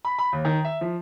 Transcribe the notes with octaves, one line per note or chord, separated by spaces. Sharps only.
B5
B5
D#2
D#3
E5
F3